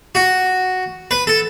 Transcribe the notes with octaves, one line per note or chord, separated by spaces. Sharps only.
F#4
B4
A4